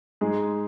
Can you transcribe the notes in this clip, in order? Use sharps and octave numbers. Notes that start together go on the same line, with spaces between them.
G#2 G#3 G#4